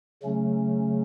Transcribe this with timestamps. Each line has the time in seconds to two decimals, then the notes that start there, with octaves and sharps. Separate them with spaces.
0.23 C#3 F#3 A3 C#4